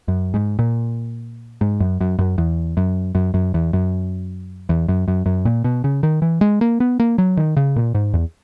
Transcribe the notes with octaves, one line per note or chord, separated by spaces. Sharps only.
F#2
G#2
A#2
G#2
F#2
F#2
F#2
E2
F#2
F#2
F#2
E2
F#2
E2
F#2
F#2
F#2
A#2
B2
C#3
D#3
E3
G#3
A#3
B3
A#3
F#3
D#3
C#3
A#2
G#2
E2